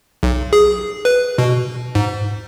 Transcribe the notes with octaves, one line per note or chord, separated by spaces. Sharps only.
B1
G#4
B4
B2
G#2